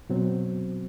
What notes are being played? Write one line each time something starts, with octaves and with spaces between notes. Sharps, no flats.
B2 F#3 C4